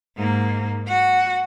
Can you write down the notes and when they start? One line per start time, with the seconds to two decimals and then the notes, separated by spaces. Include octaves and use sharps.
0.17 G#2 A#3
0.87 F#4 F#5